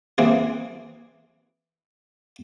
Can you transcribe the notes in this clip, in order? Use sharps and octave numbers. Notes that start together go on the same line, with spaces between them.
E3 A#3 C4 G#4